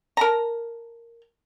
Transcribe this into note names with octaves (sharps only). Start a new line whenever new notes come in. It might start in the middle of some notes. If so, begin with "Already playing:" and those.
A#4 A5 A#5